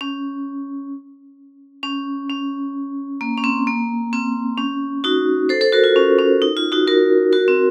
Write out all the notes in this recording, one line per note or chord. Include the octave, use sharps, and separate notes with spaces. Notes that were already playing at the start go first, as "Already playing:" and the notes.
C#4
C#4
C#4
A#3
C#4
C4
A#3
C4
C#4
D#4 F#4
A4 C5
A4 C5
F#4 A#4
F4
C#4
C#4
D#4
F4
D#4 F#4
F#4 A#4
F#4 A#4
C4